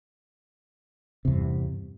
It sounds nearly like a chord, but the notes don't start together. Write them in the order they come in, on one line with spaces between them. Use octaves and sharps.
C3 E2 G2